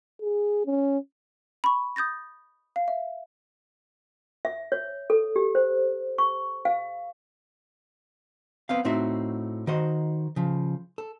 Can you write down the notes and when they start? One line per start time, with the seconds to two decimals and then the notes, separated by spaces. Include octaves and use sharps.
0.21 G#4
0.66 C#4
1.64 B5 C#6
1.96 D#6 G6 A6 A#6
2.76 F5
2.88 E5
4.45 E5
4.72 C#5
5.10 A4
5.36 G4
5.55 C5
6.18 C#6
6.65 F5
8.69 B3 C4 F5
8.85 A2 C4 D#4 F#4 E5
9.67 D#3 F#4 C5 D#5
10.36 C#3 F3
10.98 A4